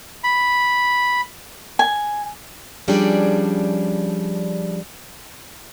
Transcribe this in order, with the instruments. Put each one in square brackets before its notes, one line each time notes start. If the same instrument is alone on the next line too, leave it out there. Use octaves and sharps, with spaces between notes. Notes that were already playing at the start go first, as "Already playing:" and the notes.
[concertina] B5
[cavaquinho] G#5
[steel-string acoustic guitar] F3 G3 C#4 D4 G#4 D5